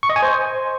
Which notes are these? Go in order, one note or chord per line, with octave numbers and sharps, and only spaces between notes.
C#6
D#5
G#5
C5